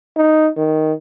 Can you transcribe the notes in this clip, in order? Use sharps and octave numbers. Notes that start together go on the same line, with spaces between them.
D#4
D#3